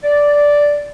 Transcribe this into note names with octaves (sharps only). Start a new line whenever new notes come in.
D5